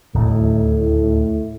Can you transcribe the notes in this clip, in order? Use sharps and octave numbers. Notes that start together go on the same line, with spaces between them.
D1 D#2 A2